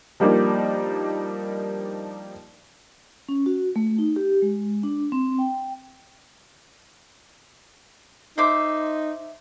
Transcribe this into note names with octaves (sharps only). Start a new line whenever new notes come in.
F3 G3 A#3 D4 D#4
C#4
F#4
A3
D#4
G4
G#3
D4
C4
G5
D#4 C5 E5 D6